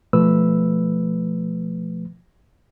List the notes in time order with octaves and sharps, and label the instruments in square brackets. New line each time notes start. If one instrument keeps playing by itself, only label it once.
[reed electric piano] B2 F3 A3 B4 E6